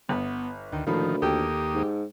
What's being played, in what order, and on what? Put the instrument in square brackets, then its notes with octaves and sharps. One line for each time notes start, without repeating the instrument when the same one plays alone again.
[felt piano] G1 [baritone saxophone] B3
[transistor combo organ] D2 [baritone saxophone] D#3
[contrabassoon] D2 [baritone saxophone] A2 [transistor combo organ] D#3 F3 [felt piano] A#3 B5
[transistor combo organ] D#2 A#3 D#6 [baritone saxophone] G4 [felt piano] A4 G5
[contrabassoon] G#2